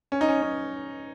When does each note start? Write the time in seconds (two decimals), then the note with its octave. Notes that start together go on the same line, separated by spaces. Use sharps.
0.12 C#4
0.21 D#4
0.28 C#4
0.42 C#4